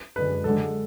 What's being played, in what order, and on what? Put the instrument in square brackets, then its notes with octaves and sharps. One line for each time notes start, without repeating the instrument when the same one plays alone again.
[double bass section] F#2 D3 G#3 [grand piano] B4
[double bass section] F#2 D3 G#3 [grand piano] A4